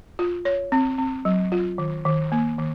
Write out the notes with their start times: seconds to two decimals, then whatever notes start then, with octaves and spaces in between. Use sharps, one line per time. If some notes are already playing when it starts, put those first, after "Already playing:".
0.19 F4
0.45 C#5
0.72 C4
0.98 C4
1.25 F#3
1.52 F4
1.78 D#3
2.05 D#3
2.32 A#3
2.58 D#3